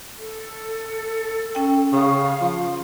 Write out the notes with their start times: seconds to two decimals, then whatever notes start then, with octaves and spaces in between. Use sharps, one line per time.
0.18 A4
1.55 C#4 G5
1.93 C#3 F5
2.41 F3